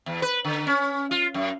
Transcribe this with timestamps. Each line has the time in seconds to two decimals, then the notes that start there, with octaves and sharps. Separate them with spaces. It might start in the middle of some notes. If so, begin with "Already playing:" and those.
0.06 E2
0.22 B4
0.45 D3
0.67 C#4
1.11 F4
1.34 F#2